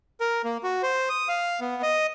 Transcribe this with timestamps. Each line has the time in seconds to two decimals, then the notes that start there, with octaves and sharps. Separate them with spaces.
0.20 A#4
0.44 A#3
0.63 F#4
0.83 C5
1.09 D#6
1.28 F5
1.60 B3
1.83 D#5